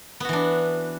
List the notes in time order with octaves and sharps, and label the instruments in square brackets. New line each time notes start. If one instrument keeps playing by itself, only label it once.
[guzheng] B3
F#4
E3
D4